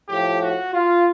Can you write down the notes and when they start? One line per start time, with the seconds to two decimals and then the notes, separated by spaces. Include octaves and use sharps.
0.08 A2 F3 G4
0.40 F#4
0.72 F4